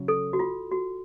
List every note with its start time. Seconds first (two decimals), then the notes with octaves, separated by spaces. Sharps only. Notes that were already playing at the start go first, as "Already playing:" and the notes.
Already playing: C#3 F#3
0.08 A4
0.33 F#4
0.39 F4
0.72 F#4